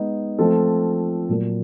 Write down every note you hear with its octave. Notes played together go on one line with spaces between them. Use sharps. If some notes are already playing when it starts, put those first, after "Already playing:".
Already playing: G#3 B3 D#4
F3 A3 C4 F4 A4
A#2 F#3 A#3